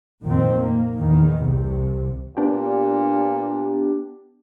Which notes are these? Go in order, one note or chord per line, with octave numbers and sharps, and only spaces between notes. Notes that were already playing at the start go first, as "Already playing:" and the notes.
F1 F2 A#2 D#3 F3 C4
A#3
A#1 E2 D#3
C2 C3
A#2 B3 D4 G4